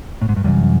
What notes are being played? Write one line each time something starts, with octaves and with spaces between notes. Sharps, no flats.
A2
G#2
G2
F#2 C3 E3 G3